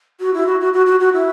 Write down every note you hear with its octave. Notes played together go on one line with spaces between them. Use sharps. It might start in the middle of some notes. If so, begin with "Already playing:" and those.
F#4
E4
F#4
F#4
F#4
F#4
F#4
E4